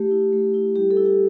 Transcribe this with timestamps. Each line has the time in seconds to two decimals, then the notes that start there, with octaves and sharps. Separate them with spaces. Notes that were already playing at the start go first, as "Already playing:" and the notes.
Already playing: A3 G4
0.11 E4
0.33 A3
0.54 E4
0.76 G3 G4
0.91 A4
0.97 E4
1.05 G4